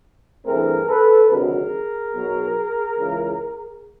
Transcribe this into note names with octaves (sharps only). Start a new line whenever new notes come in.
G2 E3 A3 C4 G#4 A#4
A4 B4
D2 C3 D#3 F#3 G#4 A#4
B1 B2 F#3 B3
C#2 C#3 E3